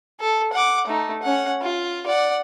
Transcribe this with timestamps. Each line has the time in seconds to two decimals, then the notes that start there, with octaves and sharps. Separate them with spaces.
0.20 A4
0.53 F#5 D6
0.87 A3 D#4
1.22 C#4 F#5
1.61 F4
2.07 D5 F#5